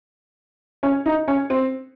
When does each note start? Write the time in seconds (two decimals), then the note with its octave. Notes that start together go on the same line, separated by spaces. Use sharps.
0.83 C#4
1.06 D#4
1.28 C#4
1.50 C4